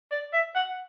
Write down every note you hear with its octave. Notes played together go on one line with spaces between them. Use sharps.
D5
E5
F#5